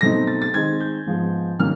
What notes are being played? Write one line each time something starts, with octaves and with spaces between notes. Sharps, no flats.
B2 F#3 A3 C4 D#4 A#6
A6
A6
D#3 G#3 C4 D#4 G#6
G6
G#2 F3 G#3 B3
D#3 F#3 A#3 C#4 F6